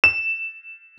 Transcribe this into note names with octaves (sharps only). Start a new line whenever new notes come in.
E7